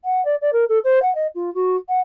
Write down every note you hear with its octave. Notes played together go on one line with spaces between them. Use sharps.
F#5
D5
D5
A#4
A4
C5
F#5
D#5
F4
F#4
F#5